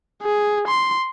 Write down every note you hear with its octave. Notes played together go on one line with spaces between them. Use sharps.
G#4
C6